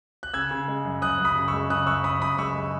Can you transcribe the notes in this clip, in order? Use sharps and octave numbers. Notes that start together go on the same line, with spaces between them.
F#6
C#3 E6 G#6
C#3
G#3
F#2
F#2 D#6 F#6
F#2
B5 D#6
C#3
C#6 E6
G#3
C#3 D#6 F#6
F#2 C#6 E6
F#2 B5 D#6
F#2 B5 D#6
G#3 C#6 E6
G#3